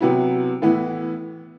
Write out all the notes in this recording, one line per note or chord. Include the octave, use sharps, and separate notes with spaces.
C3 F#3 B3 E4
A2 E3 B3 E4